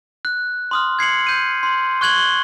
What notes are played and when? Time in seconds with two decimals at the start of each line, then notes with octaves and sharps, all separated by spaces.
0.25 F#6
0.71 C6 D#6 F6
0.99 G#6 C7 C#7 F#7
1.27 G6 D#7
1.63 C6
2.01 C#6 F#6 G#6 F#7 G7